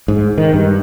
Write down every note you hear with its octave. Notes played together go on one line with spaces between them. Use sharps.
G#2
D#3
G2